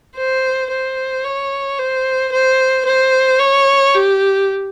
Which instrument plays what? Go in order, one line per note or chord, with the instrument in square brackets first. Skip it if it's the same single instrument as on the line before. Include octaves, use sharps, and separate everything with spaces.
[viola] C5
C5
C#5
C5
C5
C5
C#5
G4